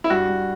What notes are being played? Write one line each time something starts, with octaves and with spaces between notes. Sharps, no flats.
E4
G2 F#4
G2